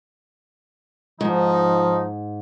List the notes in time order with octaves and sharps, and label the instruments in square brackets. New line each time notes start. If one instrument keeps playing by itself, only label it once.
[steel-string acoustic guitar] G#2 [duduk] F3 [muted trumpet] D#4